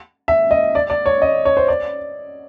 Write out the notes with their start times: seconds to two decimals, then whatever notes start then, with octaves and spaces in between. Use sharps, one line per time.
0.28 E5
0.51 D#5
0.75 D5
0.90 D5
1.06 C#5
1.22 D#5
1.45 C#5
1.57 C5
1.68 D5